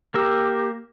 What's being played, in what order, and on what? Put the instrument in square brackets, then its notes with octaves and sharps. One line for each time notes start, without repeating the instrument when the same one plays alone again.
[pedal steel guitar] A#3 A#4 E6 [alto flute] G4